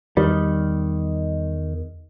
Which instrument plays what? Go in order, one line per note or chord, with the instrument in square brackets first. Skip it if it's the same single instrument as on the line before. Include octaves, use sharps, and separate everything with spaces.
[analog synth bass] E2 [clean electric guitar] D#3 [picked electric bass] G3